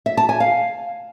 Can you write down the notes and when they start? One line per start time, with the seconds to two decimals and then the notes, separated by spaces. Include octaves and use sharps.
0.06 E5
0.17 A5
0.29 G#5
0.40 F5